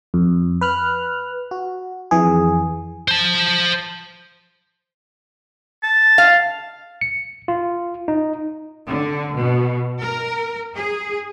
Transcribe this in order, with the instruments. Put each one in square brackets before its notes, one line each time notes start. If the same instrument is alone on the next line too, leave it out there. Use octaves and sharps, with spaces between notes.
[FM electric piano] F2
B4 F6 F#6
F#4
F2 E3 G#4
[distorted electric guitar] C5 A5
[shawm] A5
[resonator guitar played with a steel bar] F5
[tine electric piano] C#7
F4
D#4
[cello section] D3
B2
A#4
G#4